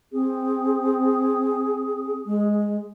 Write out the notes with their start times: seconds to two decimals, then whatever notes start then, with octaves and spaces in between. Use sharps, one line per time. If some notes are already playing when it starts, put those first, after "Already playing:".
0.13 C4 G#4
2.26 G#3